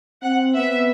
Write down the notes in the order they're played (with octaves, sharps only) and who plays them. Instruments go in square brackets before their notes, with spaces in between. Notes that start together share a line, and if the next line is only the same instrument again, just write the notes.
[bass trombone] C4 [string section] F#5
[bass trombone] B3 [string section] E5